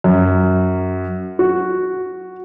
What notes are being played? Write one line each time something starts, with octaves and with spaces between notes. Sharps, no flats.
F#2
F#4